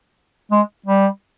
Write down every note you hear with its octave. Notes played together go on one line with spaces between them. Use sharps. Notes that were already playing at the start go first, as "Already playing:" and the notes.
G#3
G3